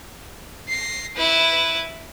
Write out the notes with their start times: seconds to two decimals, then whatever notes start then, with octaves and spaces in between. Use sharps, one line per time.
0.68 A#6 C7
1.15 E4 B4